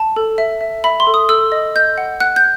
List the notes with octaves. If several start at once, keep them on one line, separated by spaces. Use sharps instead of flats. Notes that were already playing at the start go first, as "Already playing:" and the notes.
Already playing: A5
A4
E5
E5
E5 B5
C6
A4
D#6
A4 E6
D#5
D#5 G6
F#5
F#5 F#6
G6